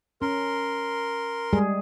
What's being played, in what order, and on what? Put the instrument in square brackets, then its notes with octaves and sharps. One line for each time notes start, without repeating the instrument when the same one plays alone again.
[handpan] C#4 [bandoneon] A#4 C6
[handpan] G3 G#3 G#4